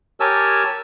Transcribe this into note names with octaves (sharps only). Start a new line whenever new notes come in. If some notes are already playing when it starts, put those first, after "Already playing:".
G4 A#4 C#5 G#5 A5 E6